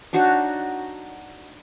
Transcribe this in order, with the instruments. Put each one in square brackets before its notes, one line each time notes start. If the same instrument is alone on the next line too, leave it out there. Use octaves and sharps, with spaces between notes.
[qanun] D4 D#4 F#4 C#5